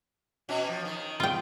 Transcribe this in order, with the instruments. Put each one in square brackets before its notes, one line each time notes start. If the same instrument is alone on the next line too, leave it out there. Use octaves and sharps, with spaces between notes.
[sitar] B2 C#4 F#4
F3
D#3
[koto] F4 G5